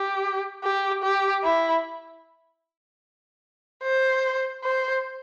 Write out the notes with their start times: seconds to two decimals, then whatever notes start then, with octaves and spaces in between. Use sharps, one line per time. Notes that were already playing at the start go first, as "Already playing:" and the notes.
Already playing: G4
0.64 G4
1.03 G4
1.44 E4
3.83 C5
4.64 C5